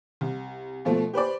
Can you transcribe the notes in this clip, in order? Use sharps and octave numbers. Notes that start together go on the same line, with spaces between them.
C2
B2 F3 A3
G4 B4 C5 D5